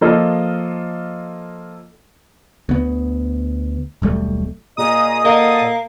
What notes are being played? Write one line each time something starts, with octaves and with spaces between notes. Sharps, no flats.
F3 A#3 F4 A4 D#5
D2 B3
D#1 B1 G3 A3
A#2 G#4 D#5 A#5 D#6
A#3 A4 D#5 F#5